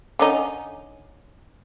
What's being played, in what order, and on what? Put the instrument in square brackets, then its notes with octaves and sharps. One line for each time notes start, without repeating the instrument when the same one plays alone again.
[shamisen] D3 C#4 D#4